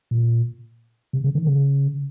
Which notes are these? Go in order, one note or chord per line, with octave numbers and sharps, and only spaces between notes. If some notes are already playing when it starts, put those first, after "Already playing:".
A#2
C3
C#3
D#3
C#3